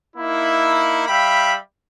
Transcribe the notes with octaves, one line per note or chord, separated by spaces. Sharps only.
A#3 D#4 E4
G3 E5 F5 G5 B5